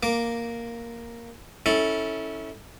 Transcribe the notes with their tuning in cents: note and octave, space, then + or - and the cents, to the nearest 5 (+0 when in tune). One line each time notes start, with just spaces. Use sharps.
A#3 +0 D6 +0
C#4 -5 E4 -25 A4 +0